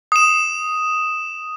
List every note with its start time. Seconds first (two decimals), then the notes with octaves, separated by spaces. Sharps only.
0.12 D#6 E7